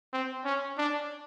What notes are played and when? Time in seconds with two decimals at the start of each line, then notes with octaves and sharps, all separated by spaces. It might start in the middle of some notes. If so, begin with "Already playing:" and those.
0.13 C4
0.45 C#4
0.78 D4